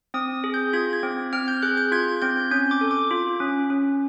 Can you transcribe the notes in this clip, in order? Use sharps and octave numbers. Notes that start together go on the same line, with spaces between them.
C4 D#6
G#4
G6
F4 G#6
G#6
C4
C4 F6
G6
G#4 F#6
G6
F4 G#6
C4 G6
C#4 G6
D6
A4
D6
F4
C#4
C#4